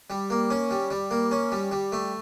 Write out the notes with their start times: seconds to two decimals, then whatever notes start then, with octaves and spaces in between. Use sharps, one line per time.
0.10 G3
0.30 A#3
0.51 C#4
0.71 G3
0.90 G3
1.11 A#3
1.31 C#4
1.52 G3
1.71 G3
1.92 A3